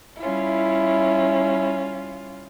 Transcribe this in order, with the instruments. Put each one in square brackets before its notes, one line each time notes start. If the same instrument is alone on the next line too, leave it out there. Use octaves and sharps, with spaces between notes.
[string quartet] G3 C#4 F4 [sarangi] E4